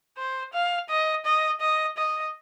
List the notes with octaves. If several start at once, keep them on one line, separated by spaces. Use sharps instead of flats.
C5
F5
D#5
D#5
D#5
D#5